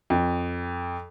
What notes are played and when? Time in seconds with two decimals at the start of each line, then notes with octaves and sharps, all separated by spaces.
0.10 F2